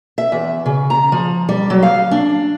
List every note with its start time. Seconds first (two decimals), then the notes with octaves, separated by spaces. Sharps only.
0.18 E5
0.32 E2
0.66 C#3
0.90 A#5
1.12 F3
1.49 G3
1.70 F#3
1.83 F5
2.11 D4